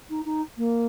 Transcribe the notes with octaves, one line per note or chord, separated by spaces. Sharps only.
D#4
D#4
A#3